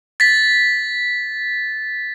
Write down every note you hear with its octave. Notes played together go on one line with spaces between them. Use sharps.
A6 B6